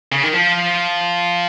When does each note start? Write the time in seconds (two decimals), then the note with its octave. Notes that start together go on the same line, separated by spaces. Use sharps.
0.12 C#3
0.23 D#3
0.33 F3